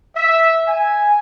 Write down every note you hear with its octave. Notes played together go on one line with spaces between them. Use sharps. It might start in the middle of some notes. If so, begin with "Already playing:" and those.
E5
G#5